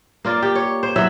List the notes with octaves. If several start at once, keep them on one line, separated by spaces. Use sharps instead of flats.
A#3 F4 D5
G4
C#5
C5
F#3 E4 E5